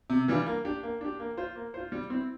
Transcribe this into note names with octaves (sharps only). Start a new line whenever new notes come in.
C3
E3 G3 D4 F4
A#3
D4 G4
A#3
D4 G4
A#3
F4 C5
A#3
F4 C5
G3
C4 E4